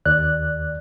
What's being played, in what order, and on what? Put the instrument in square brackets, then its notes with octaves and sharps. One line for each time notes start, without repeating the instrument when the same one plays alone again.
[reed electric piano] D#2 D5 F#6